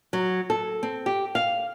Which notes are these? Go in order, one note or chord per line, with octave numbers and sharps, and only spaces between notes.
F#3
A4
C4
G4
F5